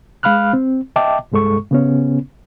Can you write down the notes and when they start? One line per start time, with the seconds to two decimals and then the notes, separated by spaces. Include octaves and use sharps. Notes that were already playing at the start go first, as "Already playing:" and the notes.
0.23 G#3 F5 B5 F6 F#6
0.53 C4
0.96 D#5 E5 G5 A5 D6
1.32 C2 G2 G#3 A4 C#6
1.71 C#3 B3 C#4